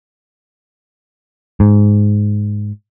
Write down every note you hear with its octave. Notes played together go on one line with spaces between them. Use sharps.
G#2